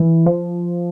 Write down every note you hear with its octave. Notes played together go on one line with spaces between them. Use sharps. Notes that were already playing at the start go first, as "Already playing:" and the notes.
Already playing: E3
F3